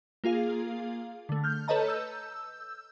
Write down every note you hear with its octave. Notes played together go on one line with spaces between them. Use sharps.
A#3 F4 G#4 F5
D3 A3
F6 G6
A4 B4 C#5 D#5 A5 A#5
E6 G6